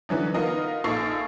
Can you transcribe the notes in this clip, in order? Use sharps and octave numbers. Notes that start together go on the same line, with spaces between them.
D3 E3 F#3 D#4
B3 D#4 F4 A#4 D#5
A#1 D#4 F4 A4 C#6 C7